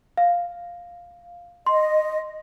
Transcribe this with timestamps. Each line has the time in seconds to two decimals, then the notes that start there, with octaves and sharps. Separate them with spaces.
0.17 F5
1.66 D#5 C6